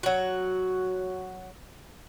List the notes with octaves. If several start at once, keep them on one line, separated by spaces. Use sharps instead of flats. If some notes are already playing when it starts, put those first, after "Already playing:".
F#3 F#4